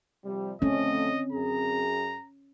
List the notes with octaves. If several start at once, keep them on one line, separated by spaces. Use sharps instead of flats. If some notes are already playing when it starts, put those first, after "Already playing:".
C3 F3 G3
F2 D3 A3 C4 C#4 D#5
F#2 G#4 A#5